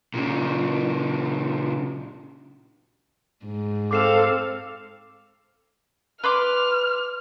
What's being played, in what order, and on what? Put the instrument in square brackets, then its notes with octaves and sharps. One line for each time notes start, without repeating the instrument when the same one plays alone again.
[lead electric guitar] A#2 C#3
[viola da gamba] G#2
[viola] C4 F5 [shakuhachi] A4 [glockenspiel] D6 C7 E7
[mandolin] B4 C6 D6 [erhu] F6